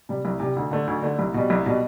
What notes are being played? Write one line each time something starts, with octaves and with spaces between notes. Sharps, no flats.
C3 G3
C2
C3 G3
D2
D3 A3
D2
D3 A3
C2
B2 G3
C2
B2 G3